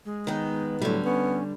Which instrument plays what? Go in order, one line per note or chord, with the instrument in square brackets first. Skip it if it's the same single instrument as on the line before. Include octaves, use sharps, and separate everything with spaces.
[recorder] G#3
[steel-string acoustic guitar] D#3 B3 [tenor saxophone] D#4
[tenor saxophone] A2 [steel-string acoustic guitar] D3 G3 [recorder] F#3
[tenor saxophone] B3 [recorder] C#4